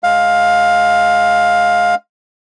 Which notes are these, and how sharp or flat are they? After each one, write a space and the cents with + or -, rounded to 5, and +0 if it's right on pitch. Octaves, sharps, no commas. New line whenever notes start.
G#3 +15 F5 +15